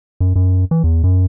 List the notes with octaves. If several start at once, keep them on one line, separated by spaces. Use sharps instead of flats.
F#2
F#2
E3
E2
F#2